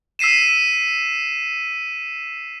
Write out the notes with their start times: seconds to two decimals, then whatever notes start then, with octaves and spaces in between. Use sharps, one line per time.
0.19 E6 B6 C7 D#7 E7